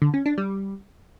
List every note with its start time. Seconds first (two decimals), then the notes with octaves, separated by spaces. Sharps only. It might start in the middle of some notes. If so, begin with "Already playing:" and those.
0.02 D3
0.14 C#4
0.26 D4
0.38 G3